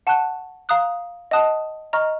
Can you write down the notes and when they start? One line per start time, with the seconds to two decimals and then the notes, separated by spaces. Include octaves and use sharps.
0.07 F#5 A5 C#6 F#6
0.69 F5 A#5 D#6 F#6
1.31 D#5 F#5 A5 D#6 F#6
1.93 D#5 A#5 C#6 F6